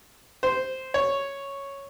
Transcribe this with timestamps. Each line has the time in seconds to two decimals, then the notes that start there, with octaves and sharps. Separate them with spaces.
0.43 C5
0.94 C#5